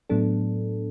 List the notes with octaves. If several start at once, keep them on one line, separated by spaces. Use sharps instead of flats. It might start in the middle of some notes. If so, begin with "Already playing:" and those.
A2 F#3 B3 D4 A4